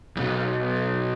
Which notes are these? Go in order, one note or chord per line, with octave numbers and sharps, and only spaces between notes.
B1 E2